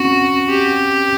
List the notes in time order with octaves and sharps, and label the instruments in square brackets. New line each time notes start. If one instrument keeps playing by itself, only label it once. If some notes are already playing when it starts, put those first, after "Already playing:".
Already playing: [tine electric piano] C4 C#4 [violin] F#4
[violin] G4